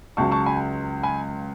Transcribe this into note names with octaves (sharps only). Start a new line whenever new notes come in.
C#2 C#3 F#3 A5 C#6
A5 C#6
G#5 B5
G#5 B5